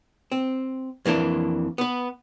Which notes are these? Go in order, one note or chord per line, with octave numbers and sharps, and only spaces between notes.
C4
F2 E3 A#3 D4
B3 B4